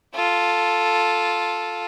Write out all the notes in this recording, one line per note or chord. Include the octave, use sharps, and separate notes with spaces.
F4 A4